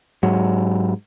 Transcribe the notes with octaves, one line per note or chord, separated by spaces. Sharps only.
G#2 F#3